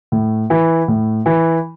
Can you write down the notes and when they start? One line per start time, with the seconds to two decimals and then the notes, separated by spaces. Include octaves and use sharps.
0.12 A2
0.50 E3
0.88 A2
1.26 E3